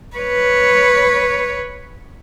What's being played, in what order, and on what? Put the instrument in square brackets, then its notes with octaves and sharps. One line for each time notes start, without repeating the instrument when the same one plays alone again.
[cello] B4 C#5